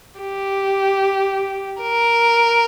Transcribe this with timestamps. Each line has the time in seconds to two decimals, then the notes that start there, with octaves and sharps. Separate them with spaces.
0.20 G4
1.82 A#4